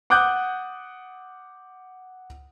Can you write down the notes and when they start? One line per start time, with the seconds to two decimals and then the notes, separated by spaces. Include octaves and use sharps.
0.10 F#5 D6 D#6 F#6 G6